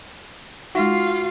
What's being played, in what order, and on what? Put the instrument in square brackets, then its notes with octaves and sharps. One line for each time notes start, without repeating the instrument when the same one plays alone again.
[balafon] G#3 D#4 [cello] F4 F5 [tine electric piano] F#4